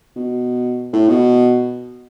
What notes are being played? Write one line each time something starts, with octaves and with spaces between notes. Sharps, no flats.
B2
A2
B2